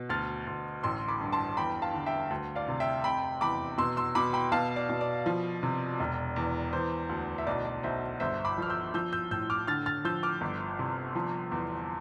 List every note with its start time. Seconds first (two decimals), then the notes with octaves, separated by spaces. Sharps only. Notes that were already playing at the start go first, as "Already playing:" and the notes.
Already playing: B2
0.09 D2 F6 A6
0.47 D2
0.83 A1 C6 E6
1.08 B5 D6
1.21 G2
1.32 A5 C6
1.57 E2 G5 B5
1.82 F5 A5
1.94 D3
2.06 E5 G5
2.30 D2
2.55 D5 F5
2.68 C3
2.80 E5 G5
3.04 F1 G5 B5
3.41 E2 B5 D6
3.78 B2 C6 E6
3.97 C6 E6
4.15 B2 B5 D6
4.33 G5 B5
4.52 B2 F5 A5
4.76 D5
4.89 B2
5.01 D5
5.26 F3
5.63 C3
6.00 E1
6.36 E2
6.73 E3 C5
7.09 D2
7.38 E5
7.47 B1 D5
7.65 D5
7.83 B1 C5 E5
8.20 G1 C5 E5
8.45 B5 D6
8.58 F3 F6
8.70 E6 G6
8.94 F3 E6 G6
9.13 E6 G6
9.31 A2 E6 G6
9.50 D6 F6
9.67 D3 F6 A6
9.86 F6 A6
10.05 F3 E6 G6
10.23 D6 F6
10.41 G1
10.79 C3
11.15 F3
11.51 E2